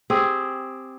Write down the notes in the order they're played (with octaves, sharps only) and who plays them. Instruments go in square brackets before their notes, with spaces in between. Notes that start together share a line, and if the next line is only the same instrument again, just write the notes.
[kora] C4 G4 G#4